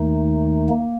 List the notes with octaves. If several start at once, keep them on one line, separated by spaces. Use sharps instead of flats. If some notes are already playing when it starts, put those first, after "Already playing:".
Already playing: D#2 D#3 A3 D#4
A#3